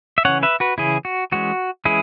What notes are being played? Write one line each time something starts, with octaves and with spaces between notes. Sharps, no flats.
E5
C#3 E3 C#4 C#5 F#5
B4 E5
F#4 B4
C#3 E3 C#4 E4 G#4
F#4
E3 G#3 C#4 F#4
E3 G#3 C#4 E4 G#4